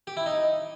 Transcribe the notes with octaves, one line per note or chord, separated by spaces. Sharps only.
G4
E4
D#4